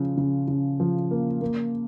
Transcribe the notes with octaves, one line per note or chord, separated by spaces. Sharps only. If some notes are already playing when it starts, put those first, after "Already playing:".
Already playing: C#3 F3
C#3
C#3
F3
A#3
A#3